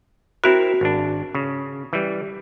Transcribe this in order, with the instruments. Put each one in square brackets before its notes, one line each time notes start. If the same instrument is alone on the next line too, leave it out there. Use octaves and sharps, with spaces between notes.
[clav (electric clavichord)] C4 E4 A#4 [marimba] F#4
[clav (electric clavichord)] G#1 D4
C#3
E3 G3